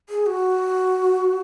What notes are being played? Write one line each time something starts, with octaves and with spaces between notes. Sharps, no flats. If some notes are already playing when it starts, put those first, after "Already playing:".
G#4
F#4